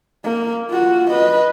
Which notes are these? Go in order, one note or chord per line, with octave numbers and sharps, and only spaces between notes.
A#3
F4 F#4
B4 D#5